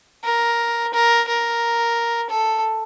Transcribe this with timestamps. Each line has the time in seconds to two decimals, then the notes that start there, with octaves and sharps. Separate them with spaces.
0.24 A#4
0.94 A#4
1.28 A#4
2.30 A4